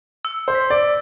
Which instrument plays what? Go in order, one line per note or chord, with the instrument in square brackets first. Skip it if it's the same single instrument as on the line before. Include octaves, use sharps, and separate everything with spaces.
[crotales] E6
[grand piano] C5
[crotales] B6
[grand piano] D5